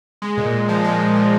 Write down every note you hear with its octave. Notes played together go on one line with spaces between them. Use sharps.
G#3
A#2
A#2
F3
G#3
A#2
A#2